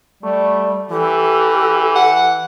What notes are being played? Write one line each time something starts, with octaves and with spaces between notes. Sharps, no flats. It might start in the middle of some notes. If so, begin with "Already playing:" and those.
G3 A3
E3 G4 A4
F#5